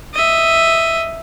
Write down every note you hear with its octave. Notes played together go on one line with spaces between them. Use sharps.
D#5 E5